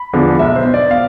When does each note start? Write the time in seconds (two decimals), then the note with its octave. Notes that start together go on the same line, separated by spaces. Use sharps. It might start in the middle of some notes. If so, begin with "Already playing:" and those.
Already playing: B5
0.13 E2 D3 F3
0.39 B1 E5
0.56 C5
0.65 B2
0.74 D5
0.91 F5